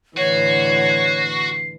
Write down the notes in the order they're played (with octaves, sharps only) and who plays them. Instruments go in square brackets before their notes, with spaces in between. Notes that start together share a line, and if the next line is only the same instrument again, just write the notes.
[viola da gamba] A2 D3 E3 [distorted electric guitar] F#4 [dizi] C#5 [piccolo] C7